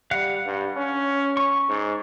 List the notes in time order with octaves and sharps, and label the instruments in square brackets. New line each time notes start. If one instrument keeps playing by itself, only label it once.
[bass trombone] G3 [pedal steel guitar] F5 F#5 F#6
[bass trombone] G2
C#4
[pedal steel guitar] C#6
[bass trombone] G#2